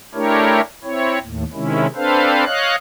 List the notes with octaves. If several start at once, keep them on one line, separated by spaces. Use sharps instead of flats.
A3 D4 E4 G4 A#4 C#5
C4 E4 C#5
D#2 A2
C3 D#3 G#3 C#4 E4
C4 D4 A4 B4 C5 F5
C#5 D#5 F5 F#6